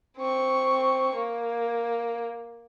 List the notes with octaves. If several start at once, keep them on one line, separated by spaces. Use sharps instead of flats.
C4 C#6
A#3